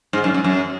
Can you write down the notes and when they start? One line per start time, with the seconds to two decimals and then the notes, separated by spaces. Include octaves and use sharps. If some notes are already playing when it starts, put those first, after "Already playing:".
0.13 G#2
0.24 F#2
0.34 F#2
0.44 F#2